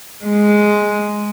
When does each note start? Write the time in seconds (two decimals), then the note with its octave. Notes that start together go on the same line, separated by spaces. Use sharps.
0.25 G#3